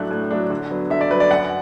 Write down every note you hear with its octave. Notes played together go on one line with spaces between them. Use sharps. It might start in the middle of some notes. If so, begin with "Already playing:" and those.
Already playing: A2 F#3 A3 D4 F#6
A2
F#3 A3 D4
D3
F#3 B3
D3 E5
D5
F#3 B3 B4
D5
F#2 F#5